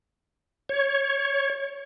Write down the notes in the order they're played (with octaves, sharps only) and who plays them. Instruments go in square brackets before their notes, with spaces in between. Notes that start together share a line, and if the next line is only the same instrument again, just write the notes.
[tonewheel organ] C#5